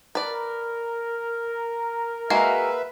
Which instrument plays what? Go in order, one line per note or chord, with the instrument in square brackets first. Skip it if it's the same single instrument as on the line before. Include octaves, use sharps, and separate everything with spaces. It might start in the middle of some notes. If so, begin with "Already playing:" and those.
[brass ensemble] A#4 [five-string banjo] B4 D5
[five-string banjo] G#3 A#3 F#4 [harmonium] B4 E5